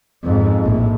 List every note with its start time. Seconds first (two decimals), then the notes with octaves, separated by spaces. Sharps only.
0.24 F2 G#2
0.64 A#1 A2